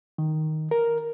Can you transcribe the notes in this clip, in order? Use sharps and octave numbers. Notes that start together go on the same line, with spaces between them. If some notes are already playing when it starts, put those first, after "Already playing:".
D#3
A#4